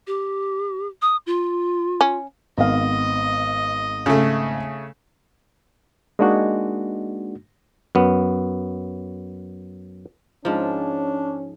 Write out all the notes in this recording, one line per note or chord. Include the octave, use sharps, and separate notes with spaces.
G4
D#6
F4
C#4
G#1 B3 D#5 F5
C#3 A3
G#3 A#3 D4 D#4 F#4
F#2 B3
G#2 F3 C#4 D4